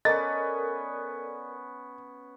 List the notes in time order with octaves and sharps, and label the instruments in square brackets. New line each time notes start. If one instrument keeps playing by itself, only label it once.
[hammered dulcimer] B3 C#4 [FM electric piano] A4 A#4 D5 [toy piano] D#5 [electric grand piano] A6